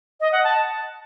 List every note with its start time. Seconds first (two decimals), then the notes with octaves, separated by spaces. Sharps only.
0.21 D#5
0.32 F#5
0.44 A5